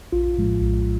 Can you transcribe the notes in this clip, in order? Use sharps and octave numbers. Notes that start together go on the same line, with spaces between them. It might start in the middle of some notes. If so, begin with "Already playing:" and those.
A#1 F4
A2 F3 G#3
A#1